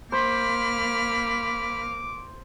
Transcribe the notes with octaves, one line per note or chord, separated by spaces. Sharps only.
A#3 C5 B5 D6 F6